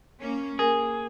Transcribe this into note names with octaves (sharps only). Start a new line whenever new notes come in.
A#3 C#4
A#3 G#4 A#4 G#5